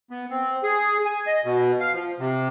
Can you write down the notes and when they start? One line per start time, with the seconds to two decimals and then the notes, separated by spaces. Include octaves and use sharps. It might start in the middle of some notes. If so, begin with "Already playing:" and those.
0.11 B3
0.31 C4
0.63 G#4
1.05 G#5
1.27 D#5
1.45 B2
1.80 F5
1.93 F3
2.19 C3